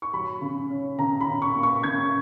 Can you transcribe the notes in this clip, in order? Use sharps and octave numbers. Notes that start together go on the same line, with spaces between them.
C#6
F#3 B5
C#3
C#4
C#3 A#5
B5
C#3
C#6
A#3
C#6
C#3 G#6